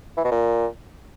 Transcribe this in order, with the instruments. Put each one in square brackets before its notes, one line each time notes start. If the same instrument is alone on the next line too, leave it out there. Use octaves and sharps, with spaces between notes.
[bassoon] E3
B2
A#2